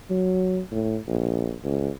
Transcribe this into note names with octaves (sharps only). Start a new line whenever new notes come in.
F#3
A2
A#1
C#2